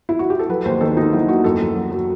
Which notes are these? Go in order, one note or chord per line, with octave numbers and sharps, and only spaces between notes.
E4
F#4
G4
A4
F#3 B4
D#2 C5
D#3 A4
D#2 D#4
F#3 E4
D#2 F#4
F#2 A4
F#2
F#3
F#3 F#4